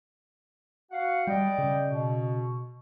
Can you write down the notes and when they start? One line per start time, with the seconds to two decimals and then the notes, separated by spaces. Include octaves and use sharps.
0.91 F#4 F5 F#5
1.27 G3 D5 D#5 G5
1.58 C#3
1.88 B2